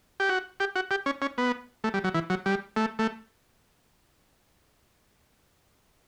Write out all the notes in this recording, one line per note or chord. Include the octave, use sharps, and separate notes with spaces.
G4
F#4
G4
F#4
G4
C#4
C#4
B3
A3
G3
F#3
E3
F#3
G3
A3
A3